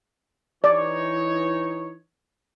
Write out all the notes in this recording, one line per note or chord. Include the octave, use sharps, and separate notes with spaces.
E3 D#4 C#5 D5